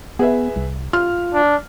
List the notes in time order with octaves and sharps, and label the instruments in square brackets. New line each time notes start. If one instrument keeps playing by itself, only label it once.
[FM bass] B3 [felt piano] G#4 B4 E5
[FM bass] C2
[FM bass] F4 [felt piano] F6
[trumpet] D4